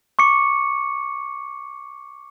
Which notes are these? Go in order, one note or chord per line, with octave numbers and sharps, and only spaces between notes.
C#6 D6 C#7